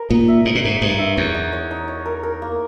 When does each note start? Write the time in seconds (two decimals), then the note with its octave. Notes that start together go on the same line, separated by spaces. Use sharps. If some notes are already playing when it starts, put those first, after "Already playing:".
Already playing: A#4
0.09 A#2 D#4
0.28 E5
0.45 G#2 D#4
0.55 A#2
0.64 G#2 D#4
0.81 G2 D#4
0.99 E5
1.16 E2 C#5
1.34 D#4
1.53 C#5
1.71 D#4
1.88 C#5
2.05 A#4
2.23 A#4
2.42 A#3